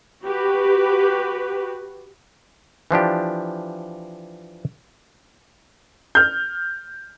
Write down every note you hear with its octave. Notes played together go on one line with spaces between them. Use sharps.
F#4 G4 B4
E3 F3 D4 G4
F6 G6